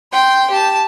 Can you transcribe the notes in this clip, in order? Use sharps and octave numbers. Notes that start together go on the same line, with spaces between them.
G5 C6
G4 A5